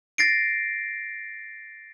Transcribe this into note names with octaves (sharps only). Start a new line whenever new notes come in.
A6 A#6 C7 D7